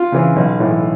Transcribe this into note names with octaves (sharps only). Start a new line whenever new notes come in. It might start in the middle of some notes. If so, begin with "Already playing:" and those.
Already playing: F4
C#3 E3
B1
A2 E3